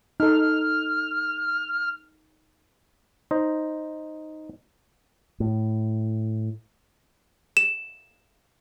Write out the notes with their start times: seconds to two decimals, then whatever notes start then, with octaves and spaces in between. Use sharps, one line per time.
0.20 D#4 A4 F6
3.31 D#4 C5 D#5
5.40 A2
7.57 E7